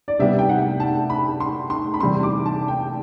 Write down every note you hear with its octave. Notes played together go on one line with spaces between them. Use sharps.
D5
C3 G3 B3 D4 E5
G5
F#5
A5
B5
C6
C6
B5
E2 C3 G3 D4 C6
D6
A5
G5